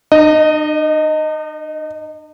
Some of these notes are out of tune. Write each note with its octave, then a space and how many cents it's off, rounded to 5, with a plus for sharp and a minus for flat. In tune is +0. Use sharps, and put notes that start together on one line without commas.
D#4 -45 D#5 -5